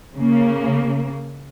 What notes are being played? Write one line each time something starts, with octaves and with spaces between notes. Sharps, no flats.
C#3 A#3